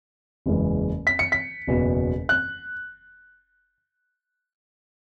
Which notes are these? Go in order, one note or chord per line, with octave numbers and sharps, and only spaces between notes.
F#1 E2 E3 G#3
B6
C#7
B6
F#1 E2 B2
F#6